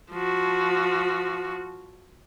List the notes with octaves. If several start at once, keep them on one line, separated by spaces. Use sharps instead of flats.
F3 F#4